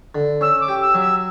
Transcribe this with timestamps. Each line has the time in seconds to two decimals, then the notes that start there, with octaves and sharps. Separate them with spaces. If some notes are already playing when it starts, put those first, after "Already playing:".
0.15 D3
0.41 C#4 E6
0.61 D6
0.68 G4
0.81 E6
0.94 F#3
1.01 E6